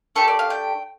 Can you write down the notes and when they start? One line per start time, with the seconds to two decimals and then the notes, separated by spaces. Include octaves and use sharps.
0.16 A3 D4 G4 A4
0.28 D5
0.39 F5
0.50 G5